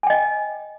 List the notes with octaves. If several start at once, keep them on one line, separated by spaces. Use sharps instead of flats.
D#5 G5 G#5